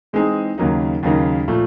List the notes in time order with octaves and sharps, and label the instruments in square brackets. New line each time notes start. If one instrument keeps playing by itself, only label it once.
[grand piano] E3 G#3 C4 D#4 G#4
D#2 C#3 F#3 A#3 D#4
D#2 C#3 F#3 A#3 D#4
A#2 F3 A3